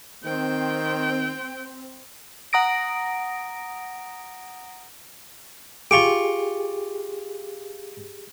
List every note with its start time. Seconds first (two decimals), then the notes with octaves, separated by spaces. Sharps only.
0.25 D#3 C4 G5
2.53 F#5 A#5 D#6 A#6 D7
5.91 F4 G4 G#4 C#6 D6